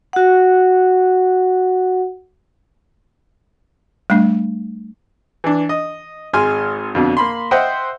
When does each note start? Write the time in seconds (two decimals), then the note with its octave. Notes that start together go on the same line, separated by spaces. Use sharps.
0.13 F#4 F#5
4.10 G3 A3 D4
5.44 E3 D4
5.69 D#5
6.33 G#1 G#3 G#5 C6 F6
6.95 F2 B2 D3
7.17 A#3 B5 C6
7.51 C5 D#5 E5 F#5 G5 C6